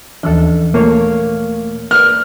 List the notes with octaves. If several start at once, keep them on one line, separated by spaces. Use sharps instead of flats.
D#2 E3 F3 D4 A4
A#2 A3 A#3 C#5
A#4 B4 D5 F6